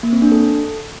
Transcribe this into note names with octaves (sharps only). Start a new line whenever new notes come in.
A#3
C4
D4
A4